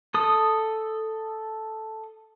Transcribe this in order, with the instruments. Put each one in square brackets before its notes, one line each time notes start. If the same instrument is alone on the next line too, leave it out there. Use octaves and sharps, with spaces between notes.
[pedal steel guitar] A4 D#6